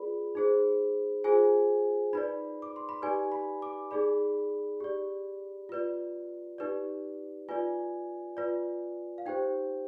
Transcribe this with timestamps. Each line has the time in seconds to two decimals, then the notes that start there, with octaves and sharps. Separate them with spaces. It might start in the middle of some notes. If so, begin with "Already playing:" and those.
Already playing: F4 G#4 B4 D5 B5
0.35 D#4 G#4 C5
1.24 F4 G#4 C5 G#5
2.13 D#4 B4 D5 B5
2.62 D6
2.76 C6
2.89 B5
3.02 D#4 G4 B4 D5 G#5
3.32 B5
3.62 D6
3.91 D#4 G#4 D5 B5
4.80 G4 D5
5.69 F4 B4 D5
6.58 D#4 G4 B4 D5
7.48 F4 B4 D5 G#5
8.37 F4 B4 D5
9.18 F5
9.26 D#4 G4 C5 G5